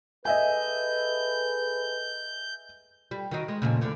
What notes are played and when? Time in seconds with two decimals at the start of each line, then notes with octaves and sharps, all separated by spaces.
0.25 G#4 A4 B4 D#5 E5 G#5 G6
3.11 G3
3.31 D#3 F#3 D#4
3.48 G#3
3.62 F2 A#2 C#3
3.81 E2 D3 A3